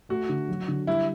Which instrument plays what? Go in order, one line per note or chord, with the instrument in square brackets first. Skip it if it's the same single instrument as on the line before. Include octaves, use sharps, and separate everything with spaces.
[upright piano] A3 [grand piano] F#4
[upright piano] D3
F#3
D3
[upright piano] G3 [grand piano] E4